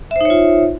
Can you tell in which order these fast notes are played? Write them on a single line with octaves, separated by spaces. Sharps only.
E5 C5 D#4 C#5 F4